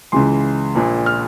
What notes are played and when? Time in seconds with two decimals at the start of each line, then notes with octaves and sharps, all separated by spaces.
0.12 C#2 C#3 E3 C6
0.75 A#1 A#2
1.06 F6